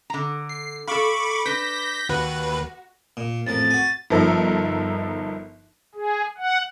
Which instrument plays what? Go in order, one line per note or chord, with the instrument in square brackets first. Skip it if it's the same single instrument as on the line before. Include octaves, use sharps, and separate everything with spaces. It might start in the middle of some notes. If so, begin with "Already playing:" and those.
[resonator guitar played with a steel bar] D3 A#5
[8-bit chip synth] C7
[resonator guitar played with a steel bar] A4 F5 [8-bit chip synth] B5 C#6 D6
[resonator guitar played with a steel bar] D4 B4 [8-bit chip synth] G6 A#6 B6
[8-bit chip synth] D#2 B4 [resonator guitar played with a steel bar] F#4
[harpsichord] A#2
[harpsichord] A1 F2 A#4 [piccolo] A6
[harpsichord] F#4 G#5
[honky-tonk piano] G1 F3 D#4 A4 A#4 E5
[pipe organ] G#4
F#5